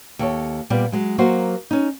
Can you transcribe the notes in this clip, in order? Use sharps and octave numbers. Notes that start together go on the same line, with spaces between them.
D#2 A4 C#5
A#2 G3 B3 D5
F#3 G#3
F#3 A#3 F#4 C5
C#4 D#4